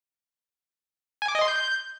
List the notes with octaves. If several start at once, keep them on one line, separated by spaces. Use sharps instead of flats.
G#5
D6
D#5
C6
G6